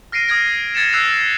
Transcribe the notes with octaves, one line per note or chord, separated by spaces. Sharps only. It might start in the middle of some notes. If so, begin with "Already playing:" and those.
F6 A#6 C7 D7 D#7
D#6 F6 G#6 A#6 D7
G#6 A6 C#7 E7
E6 F#6 C7 F7